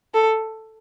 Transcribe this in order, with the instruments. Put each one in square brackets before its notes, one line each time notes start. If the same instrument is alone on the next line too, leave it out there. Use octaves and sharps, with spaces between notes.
[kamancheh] A4